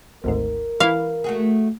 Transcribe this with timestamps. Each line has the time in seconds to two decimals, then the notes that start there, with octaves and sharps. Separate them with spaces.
0.24 G#1 D2 G#2 A#4
0.80 E3 E4 F5
1.24 A3 F#4 G#4